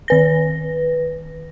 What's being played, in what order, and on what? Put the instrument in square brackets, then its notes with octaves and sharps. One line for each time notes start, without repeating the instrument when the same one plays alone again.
[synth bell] D#3 B4 A#6